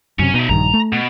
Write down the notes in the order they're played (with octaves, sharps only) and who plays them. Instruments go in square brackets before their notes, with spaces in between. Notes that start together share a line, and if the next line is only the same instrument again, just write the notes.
[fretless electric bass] F#2 C3 [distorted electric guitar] C#4
[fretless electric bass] B2 [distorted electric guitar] D#4 E5
[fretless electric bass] A#1 G2 D#3 [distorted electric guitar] A#5
[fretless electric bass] A3
[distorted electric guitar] B2